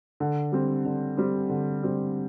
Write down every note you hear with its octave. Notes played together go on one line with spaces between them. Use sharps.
D3
G3 C4
D3
G3 C4
D3
G3 C4